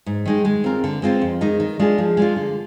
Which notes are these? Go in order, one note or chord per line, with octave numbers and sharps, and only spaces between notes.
G#2
D#3 G#3 D#4
G#3
C4 F4 A#4
D3
G#3 C4 F4 C5
F2
D#3 G#3 D#4
D#3
G#3 D4 F4 G#4
F3
G#3 D4 F4
D3